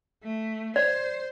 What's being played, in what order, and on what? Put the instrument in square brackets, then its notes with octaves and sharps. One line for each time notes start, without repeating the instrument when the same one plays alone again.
[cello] A3
[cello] C5 [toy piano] D5